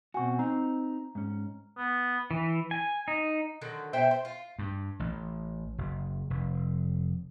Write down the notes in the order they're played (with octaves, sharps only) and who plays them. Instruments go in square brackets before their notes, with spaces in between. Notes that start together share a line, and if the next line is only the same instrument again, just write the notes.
[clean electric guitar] B2 C4 F#4 [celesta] G#5 C#6
[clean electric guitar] C4 D#4 [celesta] A#5
[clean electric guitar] G#2 C#4
[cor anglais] B3
[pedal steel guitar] E3
G#5
D#4
[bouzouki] D3 D#3 F#3
B2 C5 E5 G5
C5
F4
[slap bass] G2
A1
F#1
F1